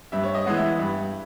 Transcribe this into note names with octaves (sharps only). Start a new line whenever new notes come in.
G2 E5
C#5
D#5
E3 G#3 B3
E5
G2